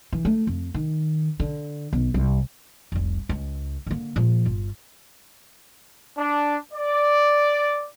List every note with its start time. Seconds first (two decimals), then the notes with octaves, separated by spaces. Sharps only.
0.13 E3
0.25 A3
0.47 F2
0.74 D#3
1.40 D3
1.93 B1
2.14 C2
2.92 F1 C2
3.29 C#2
3.86 D3 A#3
4.16 A#2 F3
4.45 G1 F4
6.18 D4
6.74 D5